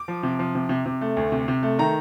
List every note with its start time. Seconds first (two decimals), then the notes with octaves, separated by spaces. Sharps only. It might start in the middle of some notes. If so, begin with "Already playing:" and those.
Already playing: D6
0.08 F3
0.23 C3
0.39 F3
0.55 C3
0.69 C3
0.86 C3
1.01 A3
1.17 D2
1.32 C3
1.48 C3
1.63 A3
1.79 D#3 A#5